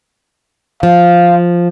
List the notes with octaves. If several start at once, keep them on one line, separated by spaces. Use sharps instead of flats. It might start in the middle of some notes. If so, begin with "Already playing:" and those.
F3 F5